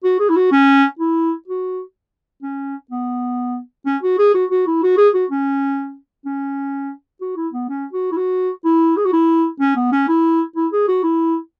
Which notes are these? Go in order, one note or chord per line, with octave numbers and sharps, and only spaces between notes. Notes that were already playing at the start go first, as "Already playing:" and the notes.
F#4
G#4
E4
F#4
C#4
E4
F#4
C#4
B3
C#4
F#4
G#4
F#4
F#4
E4
F#4
G#4
F#4
C#4
C#4
F#4
E4
B3
C#4
F#4
E4
F#4
E4
G#4
F#4
E4
C#4
B3
C#4
E4
E4
G#4
F#4
E4